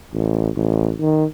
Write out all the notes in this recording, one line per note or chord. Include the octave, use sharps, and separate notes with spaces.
A1
A1
D#3